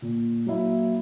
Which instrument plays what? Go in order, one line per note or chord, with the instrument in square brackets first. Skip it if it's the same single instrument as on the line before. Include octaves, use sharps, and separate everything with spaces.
[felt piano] A#2
F#3 A#3 E4